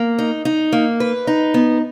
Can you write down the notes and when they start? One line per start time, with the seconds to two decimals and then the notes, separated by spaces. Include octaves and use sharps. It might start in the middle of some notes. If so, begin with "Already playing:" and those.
Already playing: A#3
0.19 D#4
0.45 D#4
0.72 A#3
1.00 B4
1.27 D#4
1.54 B3